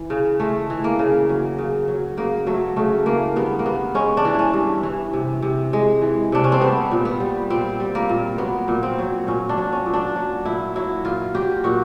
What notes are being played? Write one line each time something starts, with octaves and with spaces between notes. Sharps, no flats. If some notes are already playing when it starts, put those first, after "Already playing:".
Already playing: E3
C#3
G#3 A3
E3
A#3
C#3
F#3
C#3
F#3
C#3 A#3
F#3 A3
C#3 A3
E3 A#3
G2 B3
A#3
G2 B3
G#3 C#4
D4
E3
C#4
G2
E3
C3
C3
G#3
E3
C3 D4
C#4
C4
G3 B3
A#2
B3
G3
A#2 C4
G3
A#3
A#2
F#3 B3
A#2
C4
F#3
A#2 C#4
D4
F#3
C#4
A#2
D4
F#3
A#2 E4
F#3 E4
A#2 F4
F#3 G4
A#2 F#4